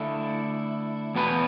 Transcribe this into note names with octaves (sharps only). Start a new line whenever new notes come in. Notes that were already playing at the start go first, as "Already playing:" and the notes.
Already playing: D3 A3 E4
E2 B2 B3 E4 B4